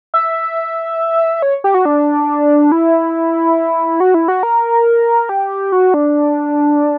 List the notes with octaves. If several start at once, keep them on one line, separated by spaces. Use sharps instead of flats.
E5
C#5
G4
F#4
D4
E4
F#4
E4
F#4
A#4
G4
F#4
D4